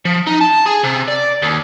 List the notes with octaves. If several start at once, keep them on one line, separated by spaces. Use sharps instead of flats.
F3
D#4
A5
G#4
C3
D5
D#2